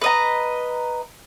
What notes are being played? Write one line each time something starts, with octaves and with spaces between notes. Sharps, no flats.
B4 D#5 A#5